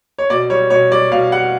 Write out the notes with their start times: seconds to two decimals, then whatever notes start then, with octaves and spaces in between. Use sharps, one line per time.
0.19 C#5
0.30 B2 D5
0.50 G3 C#5
0.70 B2 C#5
0.91 G3 D5
1.12 B2 F5
1.32 G3 F#5